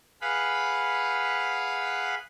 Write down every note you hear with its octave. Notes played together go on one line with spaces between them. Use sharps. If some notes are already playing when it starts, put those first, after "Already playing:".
G#4 B4 F5 F#5 B5